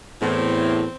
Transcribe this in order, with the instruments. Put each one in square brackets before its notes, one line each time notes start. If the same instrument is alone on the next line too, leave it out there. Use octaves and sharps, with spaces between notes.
[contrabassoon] E2 [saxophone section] A2 [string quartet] C4